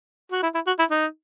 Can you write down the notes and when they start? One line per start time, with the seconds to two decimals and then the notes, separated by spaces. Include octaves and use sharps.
0.32 F#4
0.43 E4
0.55 E4
0.67 F#4
0.79 E4
0.91 D#4